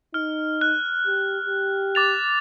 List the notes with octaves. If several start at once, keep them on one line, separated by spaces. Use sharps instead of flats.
D#4 F6
F#6
G4
G4
D6 A6 F7